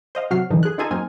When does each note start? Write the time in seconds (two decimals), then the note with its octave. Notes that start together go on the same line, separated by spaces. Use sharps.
0.15 C5 D#5 F5
0.31 C3 F#3 F#4 F6 C7
0.50 F#2 B2 D3 E3 D#4
0.63 G#4 F#6
0.78 D#4 F4 G#4 A4 G#5 A#5
0.91 F#2 A#3 C4 D#4 G#5 F6